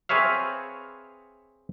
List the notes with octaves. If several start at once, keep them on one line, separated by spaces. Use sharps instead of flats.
C4 G#4 B4 C#5 E5 F5